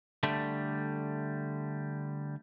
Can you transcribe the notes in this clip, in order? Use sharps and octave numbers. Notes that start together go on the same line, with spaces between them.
D3 G3 A3